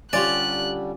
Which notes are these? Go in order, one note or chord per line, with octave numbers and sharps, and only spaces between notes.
D3 G3 C#4 F4 G4 D5 F#6